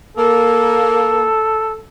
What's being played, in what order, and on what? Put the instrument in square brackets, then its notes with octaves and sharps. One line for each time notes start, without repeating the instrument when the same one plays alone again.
[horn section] A#3 [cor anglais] A4